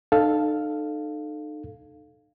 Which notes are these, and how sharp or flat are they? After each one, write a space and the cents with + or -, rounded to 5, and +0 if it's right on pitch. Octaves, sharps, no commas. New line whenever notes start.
D#4 -40 A4 +0 F5 +0